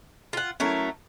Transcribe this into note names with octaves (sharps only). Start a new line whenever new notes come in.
F4 F#5
F#3 A3 C#4 E4 A#4